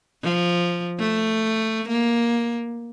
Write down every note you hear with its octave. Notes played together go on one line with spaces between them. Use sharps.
F3
A3
A#3